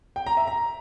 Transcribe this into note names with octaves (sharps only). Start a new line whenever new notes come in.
G5
A#5
E5
A#5